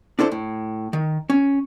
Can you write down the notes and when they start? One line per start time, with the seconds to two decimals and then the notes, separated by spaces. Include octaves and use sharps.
0.19 D4 E4 A4 C5
0.32 A2
0.93 D#3
1.30 C#4